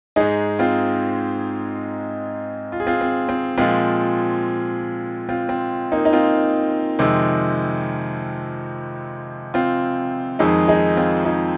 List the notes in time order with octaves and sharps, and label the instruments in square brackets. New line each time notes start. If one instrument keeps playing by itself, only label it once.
[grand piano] G#2 G#3 D#4 G#4
C4 F4
F4
G#4
C4 F4
C4
C4
A#2 F3 G#3 C4 F4
C4 F4
C4
A#3 D#4
D#4
C4 F4
F2 C3 D#3 G#3
C4 F4
F2 D#3 G#3 D#4 G#4
D#4 G#4
C4 F4
D#4 G#4